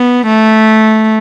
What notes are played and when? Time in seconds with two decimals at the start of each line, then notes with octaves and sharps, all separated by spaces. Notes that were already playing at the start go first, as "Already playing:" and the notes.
Already playing: B3
0.27 A3